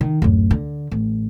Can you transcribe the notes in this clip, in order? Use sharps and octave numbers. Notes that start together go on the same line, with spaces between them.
D#3
D1 F#2
D3
A1